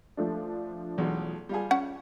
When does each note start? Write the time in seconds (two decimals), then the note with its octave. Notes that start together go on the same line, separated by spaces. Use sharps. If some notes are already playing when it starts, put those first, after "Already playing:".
0.17 F3 A3 D4
0.98 B1 E2
1.49 G3 F4 G#4
1.71 C#4 F#5